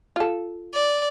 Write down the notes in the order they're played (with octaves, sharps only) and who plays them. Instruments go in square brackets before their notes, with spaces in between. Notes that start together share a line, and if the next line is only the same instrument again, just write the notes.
[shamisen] F4 A4
[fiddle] D5